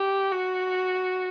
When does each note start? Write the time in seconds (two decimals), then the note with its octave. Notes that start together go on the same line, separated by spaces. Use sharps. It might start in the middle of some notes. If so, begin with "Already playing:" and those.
Already playing: G4
0.32 F#4